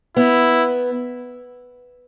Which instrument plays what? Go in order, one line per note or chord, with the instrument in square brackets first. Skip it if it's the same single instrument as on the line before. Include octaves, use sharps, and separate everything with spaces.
[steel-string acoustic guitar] B3 [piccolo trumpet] E4